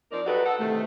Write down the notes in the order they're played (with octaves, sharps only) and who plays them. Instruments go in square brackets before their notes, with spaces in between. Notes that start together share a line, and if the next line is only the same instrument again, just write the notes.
[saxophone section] F3 C4 D#4 A#4 D5
F#3 D#4 F#4 G4 A4 B4
A4 F#5
C3 D#3 E3 A3